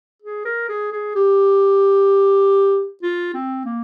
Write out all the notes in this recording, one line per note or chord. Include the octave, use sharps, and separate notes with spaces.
G#4
A#4
G#4
G#4
G4
F4
C4
A#3